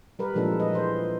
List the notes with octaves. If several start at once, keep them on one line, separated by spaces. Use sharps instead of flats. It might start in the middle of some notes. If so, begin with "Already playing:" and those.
G3 A#4 B4
A#2 E3 F3 G#3 D4 A4
G#3 B4 D#5
E3 C5